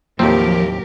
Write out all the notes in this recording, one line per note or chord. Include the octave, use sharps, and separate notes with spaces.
D#2 A2 F3 F#3 A#3 C4 G4 A#4